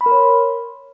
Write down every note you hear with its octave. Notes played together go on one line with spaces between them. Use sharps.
B5
A#4
C#5
C6